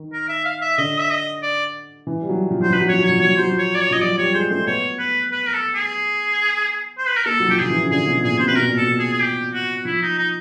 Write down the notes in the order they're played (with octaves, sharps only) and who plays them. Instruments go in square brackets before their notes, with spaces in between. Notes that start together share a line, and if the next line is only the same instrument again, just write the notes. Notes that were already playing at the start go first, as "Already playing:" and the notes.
Already playing: [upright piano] D#3
[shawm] A#4
E5
F5
E5
[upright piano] D3 [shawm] D#5
[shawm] E5
D#5
D5
[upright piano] E3
G3
F#3
F3
[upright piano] F#3 [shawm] C5
[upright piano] F3 [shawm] B4
[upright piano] F#3
[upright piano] F3 [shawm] C#5
[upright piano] F#3
[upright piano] F3 [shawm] C#5
[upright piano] F#3 [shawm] C#5
[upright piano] F3
[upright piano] F#3 [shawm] C5
[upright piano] F3
[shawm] C#5
D5
C#5
[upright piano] F3 [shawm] D#5
[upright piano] F#3 [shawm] D5
[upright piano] G3 [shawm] C#5
[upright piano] G#3 [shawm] C5
[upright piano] A3 [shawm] C5
[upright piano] B3 [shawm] C#5
[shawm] B4
B4
A#4
A4
G#4
C5
B4
A#4
[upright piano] A#3 [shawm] A4
[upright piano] F#3
[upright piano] F3 [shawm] G4
[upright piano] F3 [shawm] G#4
[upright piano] E3
C#3
[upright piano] D3 [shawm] G#4
[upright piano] B2
[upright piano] A#2 [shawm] G#4
[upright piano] C3 [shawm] C5
[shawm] B4
[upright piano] B2 [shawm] A#4
[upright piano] A#2
[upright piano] B2 [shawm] A4
[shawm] G#4
G#4
G4
F#4
[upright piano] F3 [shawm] E4
[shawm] D#4
D#4